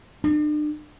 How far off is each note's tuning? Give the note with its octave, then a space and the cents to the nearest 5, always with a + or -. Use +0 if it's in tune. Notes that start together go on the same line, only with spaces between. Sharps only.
D4 +40